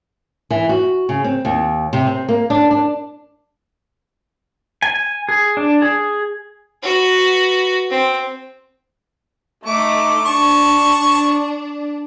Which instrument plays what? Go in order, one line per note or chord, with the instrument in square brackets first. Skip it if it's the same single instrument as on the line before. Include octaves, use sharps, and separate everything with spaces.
[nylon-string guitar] E3
F#4
C#3
C4
D#2
C3
C4
A#3
D4
D4
[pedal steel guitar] G#5
G#4
D4
G#4
[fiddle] F#4 B4
C4
[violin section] A3 D#4 [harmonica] D6
[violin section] D4 [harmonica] A5 C#6